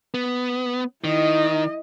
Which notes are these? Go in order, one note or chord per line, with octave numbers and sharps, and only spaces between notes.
B3
D#3 E4 D#5